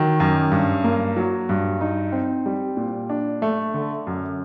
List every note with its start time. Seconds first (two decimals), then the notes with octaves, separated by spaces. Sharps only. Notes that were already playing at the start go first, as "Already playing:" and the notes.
Already playing: D#3 F#3
0.20 F#2
0.52 G2
0.84 A#3
1.17 F#3
1.49 G2
1.81 D#4
2.12 C4
2.46 G3
2.77 A#2
3.10 D4
3.42 A3
3.74 D3
4.07 F#2